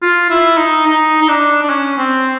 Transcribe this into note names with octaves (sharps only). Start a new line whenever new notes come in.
F4
E4
D#4
D#4
D#4
D4
D4
C#4
C4